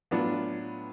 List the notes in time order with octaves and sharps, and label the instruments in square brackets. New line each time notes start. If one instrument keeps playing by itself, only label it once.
[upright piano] A2 F#3 B3 D4 F4